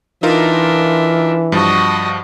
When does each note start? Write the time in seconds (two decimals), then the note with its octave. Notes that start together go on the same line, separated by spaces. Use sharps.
0.23 E3 D4 D#4 F4 A#4 E5
1.52 G2 F3 F#4 D#5 A5